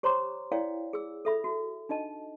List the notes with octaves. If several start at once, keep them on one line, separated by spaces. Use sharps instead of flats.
G4 C5 C#5 A#5 C6 D6
E4 C#5 D5 F5 G5
G#4 E6
A4 E5 B5
F#4
D4 D#4 D#5 A5